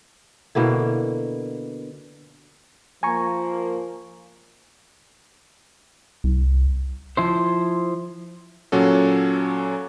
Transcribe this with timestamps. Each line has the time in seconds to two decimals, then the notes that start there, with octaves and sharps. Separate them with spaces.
0.55 B2 D3 A#3 E4
3.03 F3 A#3 G#5 A#5 C#6
6.24 C2
7.17 F3 E4 C5
8.72 A#2 F#3 C#4 F#4 A4